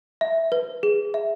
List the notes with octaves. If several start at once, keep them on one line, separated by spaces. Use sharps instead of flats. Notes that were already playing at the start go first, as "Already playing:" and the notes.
E5
B4
G#4
E5